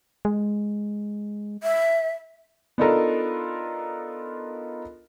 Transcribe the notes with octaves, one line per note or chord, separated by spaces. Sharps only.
G#3
E5
B3 D4 D#4 F4 A4 A#4